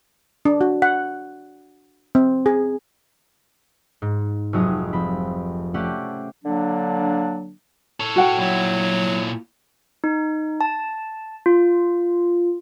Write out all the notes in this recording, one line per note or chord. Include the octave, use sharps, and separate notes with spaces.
D4
F#4
F#5
C4
G#4
G#2
F1 F2 F#3 G#4 D#6 G#6
F3 C4 B5
A3 C#4 G4 C5 D5 F#5
D3 F#3 A#3 D4
A4 C#5
F#4 F#5 G5
A#2 F#3 E4
D#4
A5
F4